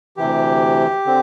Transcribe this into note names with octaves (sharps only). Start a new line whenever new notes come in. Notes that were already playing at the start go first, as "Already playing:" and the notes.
D2 C3 E3 G4
D3 C4